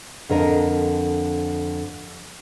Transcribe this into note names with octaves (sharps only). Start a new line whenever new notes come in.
F2 D3 A#4 D#5